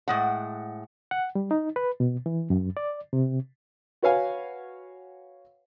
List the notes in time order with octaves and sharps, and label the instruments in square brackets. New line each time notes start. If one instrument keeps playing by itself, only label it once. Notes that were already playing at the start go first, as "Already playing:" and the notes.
[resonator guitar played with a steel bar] A2 G#3 F#5
[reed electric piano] F#5
G3
D#4
B4
B2
E3
F#2
D5
C3
[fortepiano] F#4 B4 C#5 F5 G#5